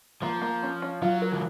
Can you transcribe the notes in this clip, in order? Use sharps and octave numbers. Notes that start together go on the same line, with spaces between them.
F3 A#3
A#3
C#4
C#4
F#3 F4
A#4
E3